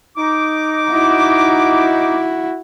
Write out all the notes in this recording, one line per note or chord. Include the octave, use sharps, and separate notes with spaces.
D#4 D6
E4 F#4